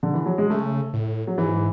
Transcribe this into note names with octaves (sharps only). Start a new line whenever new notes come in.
D3
E3
F#3
G#3
C#3 A3
A2
F#3
G#2 E3